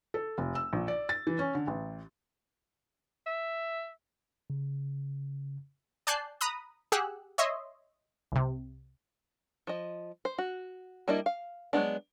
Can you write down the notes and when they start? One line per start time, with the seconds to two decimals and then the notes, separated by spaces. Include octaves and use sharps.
0.14 A4
0.38 F1
0.55 E6
0.73 A#1
0.88 D5
1.09 A6
1.27 E3
1.39 C#4
1.55 D3
1.67 A1
3.26 E5
4.50 C#3
6.07 D5 G#5 A5 F#6 G6 C7
6.41 A#5 B5 D#6 F#6
6.92 G4 G#4 F#5 E6 F#6
7.38 C#5 D#5 E5 C6
8.32 C2 C3
9.67 F3 D#5
10.25 C5
10.38 F#4
11.08 G3 A#3 D4 E4 D#5
11.26 F5
11.73 F#3 G#3 B3 D4